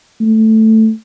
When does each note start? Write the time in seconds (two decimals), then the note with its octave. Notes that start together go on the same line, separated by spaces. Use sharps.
0.21 A3